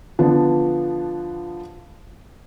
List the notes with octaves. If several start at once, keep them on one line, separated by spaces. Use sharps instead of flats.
D3 F3 B3 D4